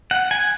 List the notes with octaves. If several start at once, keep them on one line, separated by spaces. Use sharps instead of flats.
F#5
G#5